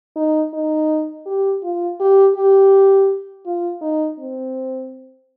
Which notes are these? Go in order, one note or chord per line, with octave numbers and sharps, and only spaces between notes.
D#4
D#4
G4
F4
G4
G4
F4
D#4
C4